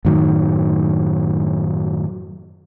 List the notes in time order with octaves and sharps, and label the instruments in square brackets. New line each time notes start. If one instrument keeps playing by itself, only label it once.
[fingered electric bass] F#2 A2 D#3 F#3